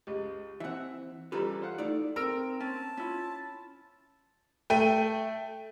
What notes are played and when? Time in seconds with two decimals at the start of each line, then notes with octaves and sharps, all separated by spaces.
0.07 C#2 G#3 G4
0.60 E3 C4 E5 F#5
1.32 C#3 E3 G3 F4 G4 A4 B4 A#5
1.62 C5 F5 F#5
1.78 A3 D#4 E4 A4 D5
2.16 C4 A#4 E6 D7
2.60 C#4 A5
2.97 C#4 E4 F4
4.70 A3 G5 D#7